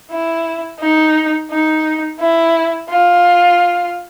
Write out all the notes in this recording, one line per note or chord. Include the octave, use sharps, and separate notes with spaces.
E4
D#4
D#4
E4
F4